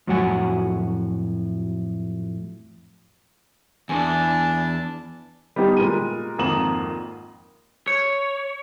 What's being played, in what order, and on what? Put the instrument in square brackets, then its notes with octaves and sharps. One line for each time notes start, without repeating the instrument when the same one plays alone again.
[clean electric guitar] F2 A2 F#3 F#4 F#5 G#5
[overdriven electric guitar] E2 [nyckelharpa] D4 A5 [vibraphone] G#5
[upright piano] G3 B3 D#4 G4
A#2 G#3 A#4 D#7
G#1 F2 A#3 A#5 E7 F#7
[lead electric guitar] C#5